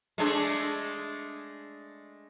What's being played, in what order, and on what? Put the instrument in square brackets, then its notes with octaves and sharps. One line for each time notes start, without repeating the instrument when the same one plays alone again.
[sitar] G#3 A3 D4